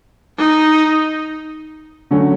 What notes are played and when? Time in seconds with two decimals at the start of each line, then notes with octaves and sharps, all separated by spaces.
0.38 D#4
2.11 D3 F#3 A3 C#4